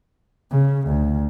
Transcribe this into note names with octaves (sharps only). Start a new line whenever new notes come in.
C#3
D2